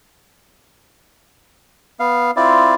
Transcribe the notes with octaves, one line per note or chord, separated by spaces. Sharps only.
B3 F5
C4 E4 F4 D5